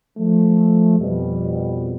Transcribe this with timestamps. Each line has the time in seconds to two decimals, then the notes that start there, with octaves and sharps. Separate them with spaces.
0.18 F3 A3
0.99 F2 B2 G3